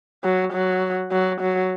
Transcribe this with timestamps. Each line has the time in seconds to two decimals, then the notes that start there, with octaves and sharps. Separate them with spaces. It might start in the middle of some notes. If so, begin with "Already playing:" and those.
0.24 F#3
0.53 F#3
1.12 F#3
1.41 F#3